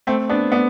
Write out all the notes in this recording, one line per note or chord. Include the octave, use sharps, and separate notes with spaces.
A3 C4
B3 D4
B3 D4